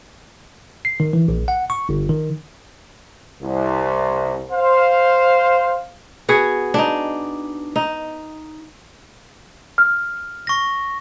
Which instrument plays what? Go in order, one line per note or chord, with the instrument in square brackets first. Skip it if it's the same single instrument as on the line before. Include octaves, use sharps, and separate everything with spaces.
[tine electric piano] C7
D#3
E3
A#1
F#5
C#6
G1
D#3
[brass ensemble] C2
C5 F5
[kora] B3 F#4 G#4
D4 D#4
D#4
[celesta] F6
[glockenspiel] C#6 A#6